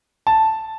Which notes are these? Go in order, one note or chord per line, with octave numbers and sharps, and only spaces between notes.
A5